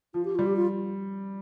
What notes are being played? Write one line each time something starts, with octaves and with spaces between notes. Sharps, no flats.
F3 F4
G4
G3 F4
G4
F4